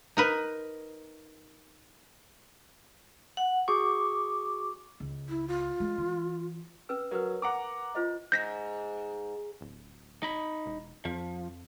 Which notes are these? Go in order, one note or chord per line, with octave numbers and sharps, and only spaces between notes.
D#4 A#4 B4
F#5
F#4 G#4 C#6 D6
C#2
E4
F4
G#3
E3
C#4 B4 E6
F#3 A#4 B4
F#5 A#5 D6
F4 C5 D#5
G#2 G6 A#6 B6
D1
D#4 B5
E1
F2 F3